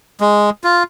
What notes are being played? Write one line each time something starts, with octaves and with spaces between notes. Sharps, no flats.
G#3
F4